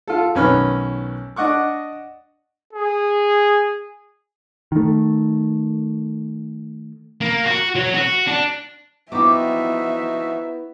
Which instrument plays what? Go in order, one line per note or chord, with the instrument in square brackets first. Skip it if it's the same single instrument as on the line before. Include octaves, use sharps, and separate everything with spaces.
[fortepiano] F4 A4
B1 D#3 C#4 B4 F6
D4 D#5 F#5 C#6 D6
[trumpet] G#4
[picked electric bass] D#3 A3
[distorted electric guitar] A#3
F#4
F#3
F#4
D4
[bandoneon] F3 D#4 F#4 [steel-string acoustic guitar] B3 E4 [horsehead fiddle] E5 [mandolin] G5 D6